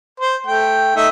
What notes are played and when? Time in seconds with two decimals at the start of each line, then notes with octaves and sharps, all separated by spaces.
0.20 C5
0.47 A3 G5
0.96 A3 D#4 E5